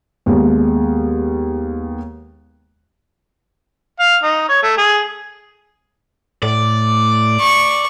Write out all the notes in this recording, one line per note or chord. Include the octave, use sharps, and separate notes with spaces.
D#2 G#3 B3
F5
D#4
C#5
A3
G#4
A2 D5
C#6